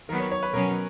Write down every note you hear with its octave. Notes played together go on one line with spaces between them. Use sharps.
D#3 F#3 B3 A#4
C#5
C#5
B4
B2 F#3 C#4 A#4